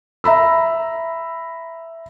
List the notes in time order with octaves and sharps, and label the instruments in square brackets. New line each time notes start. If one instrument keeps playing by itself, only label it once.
[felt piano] E5 A#5 B5 E6